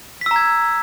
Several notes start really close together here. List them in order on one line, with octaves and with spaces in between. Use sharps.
B6 E6 A#5 G#6